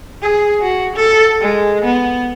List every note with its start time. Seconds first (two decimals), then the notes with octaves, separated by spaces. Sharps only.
0.22 G#4
0.61 F#4
0.96 A4
1.41 G#3
1.84 B3